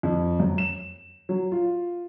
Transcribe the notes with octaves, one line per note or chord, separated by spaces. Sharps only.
F2
F#2
E7
F#3
F4